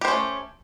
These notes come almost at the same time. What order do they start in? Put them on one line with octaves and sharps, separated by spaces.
G4 C5 C#4 A3